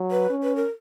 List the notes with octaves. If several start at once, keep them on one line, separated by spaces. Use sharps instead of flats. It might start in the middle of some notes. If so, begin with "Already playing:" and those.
Already playing: F#3
B4
C#4
B4
A#4